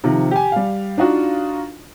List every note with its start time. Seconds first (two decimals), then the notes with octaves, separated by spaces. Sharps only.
0.04 C3 D#3 F3
0.31 G4 G#5
0.52 G3 F5
0.98 D4 D#4 F4 F#4